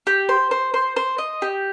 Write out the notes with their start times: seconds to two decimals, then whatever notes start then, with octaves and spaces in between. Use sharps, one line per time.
0.07 G4
0.29 C5
0.51 C5
0.74 C5
0.96 C5
1.18 D#5
1.42 G4